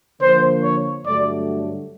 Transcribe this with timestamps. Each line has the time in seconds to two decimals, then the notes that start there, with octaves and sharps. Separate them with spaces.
0.20 D3 F3 A#3 C5
0.62 C#5
1.05 G2 D3 F#3 A3 D5